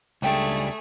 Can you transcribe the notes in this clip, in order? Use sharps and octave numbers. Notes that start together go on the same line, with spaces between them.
C#2 G3 A3 D4 G#4 F5 G5 G#5